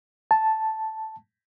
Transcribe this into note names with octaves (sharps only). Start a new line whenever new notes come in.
A5